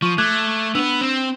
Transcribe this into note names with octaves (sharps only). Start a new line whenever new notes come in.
F3 C#6 D#7
A3 D6 F#6 G#6
B3 D4 B4 E6 F7
C4